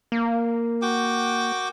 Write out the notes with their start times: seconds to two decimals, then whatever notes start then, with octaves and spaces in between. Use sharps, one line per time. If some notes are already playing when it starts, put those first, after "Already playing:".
0.12 A#3
0.82 F#4 G5 D6